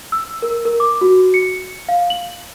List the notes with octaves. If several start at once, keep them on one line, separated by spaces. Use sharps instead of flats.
E6
A#4
A#4
D6
F#4
C#7
F5
F#7